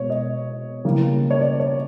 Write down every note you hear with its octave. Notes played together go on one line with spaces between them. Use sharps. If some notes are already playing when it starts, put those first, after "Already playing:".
Already playing: B2 G#3 B3 C#5
D#5
C#3 E3 G3 A#3
C#5
D5
C#5